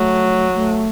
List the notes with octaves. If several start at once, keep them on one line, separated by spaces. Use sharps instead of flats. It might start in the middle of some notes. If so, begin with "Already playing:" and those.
Already playing: F#3 A3
A3